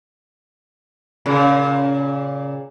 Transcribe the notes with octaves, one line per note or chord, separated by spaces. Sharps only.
A#2 C#3